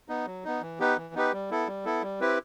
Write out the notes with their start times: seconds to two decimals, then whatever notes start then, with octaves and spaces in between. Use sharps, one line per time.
0.09 B3 D#4
0.27 F#3
0.44 B3 D#4
0.61 E3
0.80 B3 D#4 G4 B4
0.97 E3
1.14 B3 D#4 G4 B4
1.32 G3
1.50 B3 E4 A4
1.67 G3
1.85 B3 E4 A4
2.02 G3
2.20 C4 E4 G4 B4